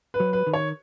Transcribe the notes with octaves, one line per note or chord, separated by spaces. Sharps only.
B4
F#3
B4
D#3
C#5